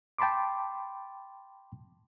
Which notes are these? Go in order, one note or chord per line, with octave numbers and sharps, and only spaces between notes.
G5 A5 B5 C6 D6